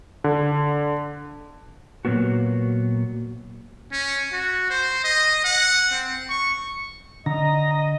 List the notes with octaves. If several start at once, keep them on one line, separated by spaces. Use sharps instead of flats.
D3
A#2 F#3 A#3 B3 F#4
C#4
F#4
C5
D#5
F#5
C4
C#6
D3 D#5 A#5